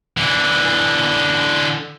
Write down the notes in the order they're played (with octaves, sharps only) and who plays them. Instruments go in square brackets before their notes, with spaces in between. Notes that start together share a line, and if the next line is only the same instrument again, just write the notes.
[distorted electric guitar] D3 E3